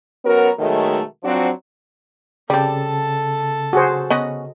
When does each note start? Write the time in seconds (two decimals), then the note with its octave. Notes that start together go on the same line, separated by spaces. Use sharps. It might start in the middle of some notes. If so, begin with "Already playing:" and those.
0.25 F#3 B3 C#4 F#4 A#4
0.59 B2 D#3 F#3 G#3 A3
1.24 F3 F#3 C4 D4 F#4
2.50 C#3 G3 C4 A4 D5 A5
3.73 F#4 G#4 C5
4.10 B3 C#4 F#4 D#5